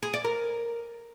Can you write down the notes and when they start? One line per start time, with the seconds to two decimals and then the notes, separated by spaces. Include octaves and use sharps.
0.03 G#4
0.13 D5
0.24 A#4